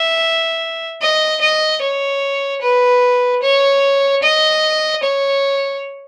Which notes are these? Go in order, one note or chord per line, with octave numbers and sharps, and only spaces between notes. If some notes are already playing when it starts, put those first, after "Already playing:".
Already playing: E5
D#5
D#5
C#5
B4
C#5
D#5
C#5